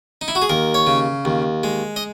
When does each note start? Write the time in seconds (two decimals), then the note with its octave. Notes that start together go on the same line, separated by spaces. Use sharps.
0.21 D#4
0.28 E4
0.35 F#4
0.42 G#4
0.50 D#2 A#4
0.74 C#5
0.87 C#3
1.25 D#2
1.63 G#3
1.96 D#5